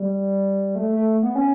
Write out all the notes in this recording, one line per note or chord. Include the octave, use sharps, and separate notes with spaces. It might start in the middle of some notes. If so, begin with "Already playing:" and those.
Already playing: G3
A3
A3
B3
C#4